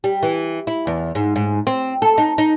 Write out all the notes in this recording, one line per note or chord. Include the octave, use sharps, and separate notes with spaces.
G3
E3
E4
E2
G#2
G#2
C4
A4
D#4
D#4